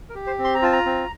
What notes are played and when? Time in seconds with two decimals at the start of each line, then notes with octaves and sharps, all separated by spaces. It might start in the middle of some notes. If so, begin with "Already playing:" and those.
0.09 A#4
0.15 G4
0.27 C5
0.38 C4
0.44 C6
0.55 A#5
0.62 F4 A5
0.73 A#5
0.86 C4